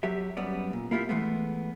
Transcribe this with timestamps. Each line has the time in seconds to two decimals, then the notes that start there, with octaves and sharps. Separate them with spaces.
0.03 F#3 G4 E5
0.37 F#2 G3 B3 D5
0.73 A#2
0.91 A#3 E4 F4 G4
1.09 E3 G#3 A3 B3